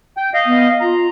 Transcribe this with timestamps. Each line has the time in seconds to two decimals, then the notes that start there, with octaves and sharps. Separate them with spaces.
0.17 G5
0.34 D#5 F5
0.45 B3
0.81 F4 A#5